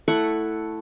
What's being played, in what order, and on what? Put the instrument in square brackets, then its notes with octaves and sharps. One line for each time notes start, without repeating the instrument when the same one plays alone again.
[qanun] A3 E4 F#5 C#6